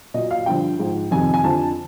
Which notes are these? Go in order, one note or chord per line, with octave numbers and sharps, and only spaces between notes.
A#2 F#3 D#5
F5
G2 D3 F3 G5
G#2 F3
F2 C3 D#3 G#5
G#5
F2 D3 F3 A5